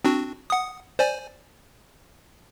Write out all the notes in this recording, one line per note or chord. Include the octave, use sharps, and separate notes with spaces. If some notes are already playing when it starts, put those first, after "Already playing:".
C4 D4 F#4
F#5 D#6
C5 D5 G#5